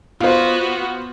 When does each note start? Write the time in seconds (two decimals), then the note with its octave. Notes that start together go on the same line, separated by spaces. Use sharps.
0.20 B3 F4 F#4 C5